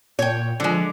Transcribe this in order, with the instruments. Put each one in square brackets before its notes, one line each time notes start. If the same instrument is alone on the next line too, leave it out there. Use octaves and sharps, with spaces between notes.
[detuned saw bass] A#2 [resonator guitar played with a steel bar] C#5 G5
[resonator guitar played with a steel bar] D3 G#3 [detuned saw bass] F3